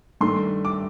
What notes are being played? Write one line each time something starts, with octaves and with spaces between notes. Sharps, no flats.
G2 D#3 A3 C6
D6